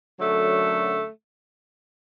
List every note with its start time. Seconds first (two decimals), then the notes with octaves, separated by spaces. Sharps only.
0.19 F#2 D3 F#3 A3